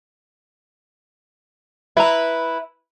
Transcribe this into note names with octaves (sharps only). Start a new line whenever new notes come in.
E4 B4 E5 A#5